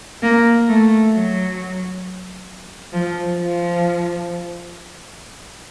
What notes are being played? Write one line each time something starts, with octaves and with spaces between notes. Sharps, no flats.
A#3
A3
F#3
F3
F3